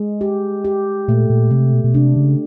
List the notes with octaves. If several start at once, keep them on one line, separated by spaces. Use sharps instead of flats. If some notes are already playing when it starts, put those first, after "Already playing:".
Already playing: G#3
G4
G4
A#2 A3
A#2
C3 A3
B2
B2
C3 D4
C#3